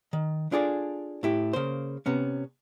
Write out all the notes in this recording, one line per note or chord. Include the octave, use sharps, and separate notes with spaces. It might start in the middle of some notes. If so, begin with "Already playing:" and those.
D#3
D4 F4 G#4 A4 D5
A2 E4 G4
C#3 A#3 C5
C3 B3 C#4